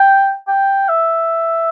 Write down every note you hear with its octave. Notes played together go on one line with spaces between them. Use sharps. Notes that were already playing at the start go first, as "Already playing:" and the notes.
Already playing: G5
G5
E5